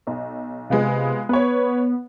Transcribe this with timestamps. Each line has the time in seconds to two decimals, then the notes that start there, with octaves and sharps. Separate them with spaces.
0.07 B1
0.70 C3 G#3 B3 F4
1.29 B3 B4 C#5